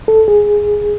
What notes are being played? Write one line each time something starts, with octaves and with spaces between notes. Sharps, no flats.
A4
G#4